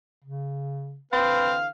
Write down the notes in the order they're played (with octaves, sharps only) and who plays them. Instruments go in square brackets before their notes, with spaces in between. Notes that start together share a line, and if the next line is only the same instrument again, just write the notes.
[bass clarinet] C#3
[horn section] D3 E3 F5 [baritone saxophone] C4 [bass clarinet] B4